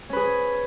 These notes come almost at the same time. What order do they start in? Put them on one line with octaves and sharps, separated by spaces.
C#4 B4 G#4